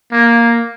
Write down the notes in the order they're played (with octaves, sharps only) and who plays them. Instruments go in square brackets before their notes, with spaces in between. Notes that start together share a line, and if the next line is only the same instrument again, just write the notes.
[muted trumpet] A#3